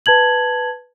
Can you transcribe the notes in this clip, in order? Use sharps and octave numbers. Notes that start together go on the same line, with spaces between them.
B4 A5 G#6 F#7